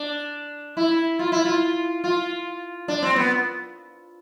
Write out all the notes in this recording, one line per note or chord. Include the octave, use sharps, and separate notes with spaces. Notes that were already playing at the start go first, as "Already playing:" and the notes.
Already playing: D4
E4
F4
E4
F4
F4
D4
C4
B3